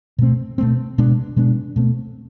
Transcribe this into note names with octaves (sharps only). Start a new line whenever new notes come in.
B2 A3 C4
B2 A3 C4
B2 G#3 B3 D4
B2 G#3 B3 D4
B2 A3 C4